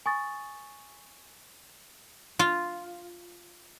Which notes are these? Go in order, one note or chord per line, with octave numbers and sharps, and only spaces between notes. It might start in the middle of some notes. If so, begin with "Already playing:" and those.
G#5 C#6 D#6 A6
F4